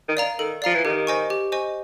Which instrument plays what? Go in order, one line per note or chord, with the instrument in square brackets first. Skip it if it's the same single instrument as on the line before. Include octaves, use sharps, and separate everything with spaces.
[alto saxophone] D#3
[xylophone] D5 F5 A#5
[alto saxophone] D#3 [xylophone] A4
[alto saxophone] F3 [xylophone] D5 F5 A#5
[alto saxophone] E3
[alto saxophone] D#3 [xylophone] G4
[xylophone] C5 D#5 G#5 C#6
G4
C5 D#5 G#5 C#6